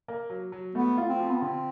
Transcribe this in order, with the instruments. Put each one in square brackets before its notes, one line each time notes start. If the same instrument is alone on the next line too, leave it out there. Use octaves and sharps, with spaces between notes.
[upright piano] A#3
F#3
F#3
[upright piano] A3 [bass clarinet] B3
[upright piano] F4
[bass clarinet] C4
[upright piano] F3
[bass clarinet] B3
[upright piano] D3 [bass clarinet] C4